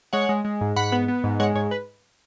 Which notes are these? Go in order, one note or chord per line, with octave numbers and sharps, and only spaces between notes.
G#3 C#5 F#5
G#3
G#3
G#2
G#2 F#5 B5
B3
B3
G#2
G#3 C#5 F#5
G#2 C#5
B4